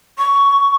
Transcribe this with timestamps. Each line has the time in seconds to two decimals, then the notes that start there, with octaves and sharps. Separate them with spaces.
0.18 C#6